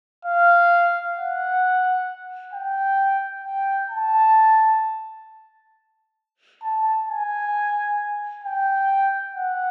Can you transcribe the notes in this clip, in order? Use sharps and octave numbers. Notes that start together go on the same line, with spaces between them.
F5
F#5
G5
G5
A5
A5
G#5
G5
F#5